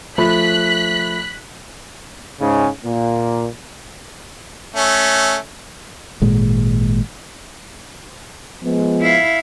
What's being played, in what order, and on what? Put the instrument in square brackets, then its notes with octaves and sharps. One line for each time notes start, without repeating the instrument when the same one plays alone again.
[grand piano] F3 A3 B5 [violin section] F#6 B6
[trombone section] G#2 C#3
A#2 A#3
[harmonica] A3 C#4
[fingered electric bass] G#1 A#2 G#3
[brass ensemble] F3 G#3 B3
[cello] E4 F5